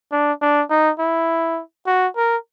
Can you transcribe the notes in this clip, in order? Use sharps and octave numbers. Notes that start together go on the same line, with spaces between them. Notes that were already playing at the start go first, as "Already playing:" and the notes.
D4
D4
D#4
E4
F#4
A#4